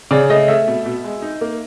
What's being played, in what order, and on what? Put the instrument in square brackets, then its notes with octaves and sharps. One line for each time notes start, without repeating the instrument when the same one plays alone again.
[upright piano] C#3 D5
A3 D#5
A3 E5
B2
B2
G#3
D#4
A#3